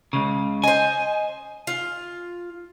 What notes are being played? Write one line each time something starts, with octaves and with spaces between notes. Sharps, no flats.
C#2 C#3
C5 D#5 G#5
F4